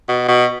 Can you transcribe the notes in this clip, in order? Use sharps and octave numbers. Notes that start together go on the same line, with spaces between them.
B2
B2